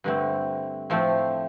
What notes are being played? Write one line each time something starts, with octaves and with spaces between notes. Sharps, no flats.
G2 D3 A3 C4
A2 F3 A3 C4